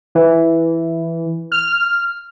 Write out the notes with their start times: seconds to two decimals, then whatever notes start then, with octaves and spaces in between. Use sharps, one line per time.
0.15 E3
1.52 F6